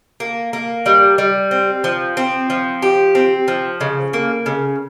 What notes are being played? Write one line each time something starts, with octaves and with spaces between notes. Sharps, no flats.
A#3
A#3
G3
G3
C4
F3
C4
F3
G4
C4
F3
C#3
A#3
C#3